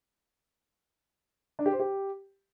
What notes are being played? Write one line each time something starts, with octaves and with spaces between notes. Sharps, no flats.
D4
G4
C5
G4